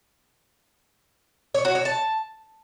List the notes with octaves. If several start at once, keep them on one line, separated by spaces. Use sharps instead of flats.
C#5
F#4
C#5
A5